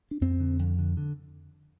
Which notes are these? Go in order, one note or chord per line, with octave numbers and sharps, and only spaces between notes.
D4
F2 C4
D3
F2
D3
D3